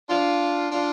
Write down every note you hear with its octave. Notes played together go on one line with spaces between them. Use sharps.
D4 F4
D4 F4